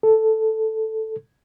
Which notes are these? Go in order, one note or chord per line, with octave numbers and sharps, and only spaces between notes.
A4